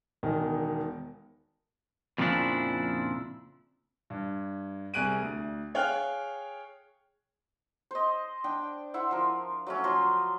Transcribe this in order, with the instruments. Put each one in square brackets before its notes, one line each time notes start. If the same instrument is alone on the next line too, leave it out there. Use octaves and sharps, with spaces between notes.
[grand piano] E1 E2 D#3
[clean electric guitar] F2 A#2 C#3 F3 D4 E4
[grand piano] G2
C2 G#4 F#6 D7 D#7
D2
G#4 C#5 F5 G5 F6 F#6
[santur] C5 D#5
D4 G5
E4 C5 E5 F#5
F3 A#4
F#3 A3 C#4
F3 F#3 A#5 C6